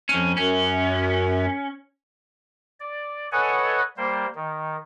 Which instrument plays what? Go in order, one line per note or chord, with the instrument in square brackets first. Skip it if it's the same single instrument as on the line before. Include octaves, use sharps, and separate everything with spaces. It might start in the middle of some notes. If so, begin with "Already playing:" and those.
[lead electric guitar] F2 C#4
[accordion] F#2 [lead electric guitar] C#4
[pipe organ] D5
A4 B4 C#5 D#5 F#5 G#5
G3 A#3 C5
D#3